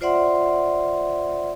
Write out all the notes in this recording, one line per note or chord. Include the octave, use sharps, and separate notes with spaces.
F4 C5 D5 E5 F#5 C6